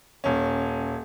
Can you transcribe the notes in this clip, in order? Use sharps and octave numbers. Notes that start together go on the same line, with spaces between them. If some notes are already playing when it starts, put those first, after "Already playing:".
D#1 C#4